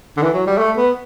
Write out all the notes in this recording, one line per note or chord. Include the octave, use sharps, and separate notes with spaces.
D3
E3
F#3
G3
A3
B3